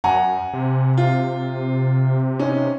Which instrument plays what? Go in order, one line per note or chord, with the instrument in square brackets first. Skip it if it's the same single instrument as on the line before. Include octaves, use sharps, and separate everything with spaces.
[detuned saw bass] F#2 [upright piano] F#5 G#5 A#5
[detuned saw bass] C3
[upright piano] F4
C#4 D#4